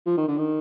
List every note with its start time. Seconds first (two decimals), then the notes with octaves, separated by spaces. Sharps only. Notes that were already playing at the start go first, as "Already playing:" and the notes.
0.06 F3
0.17 D#3
0.28 D3
0.38 D#3